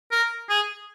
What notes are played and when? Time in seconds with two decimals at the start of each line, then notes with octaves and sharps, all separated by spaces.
0.11 A#4
0.49 G#4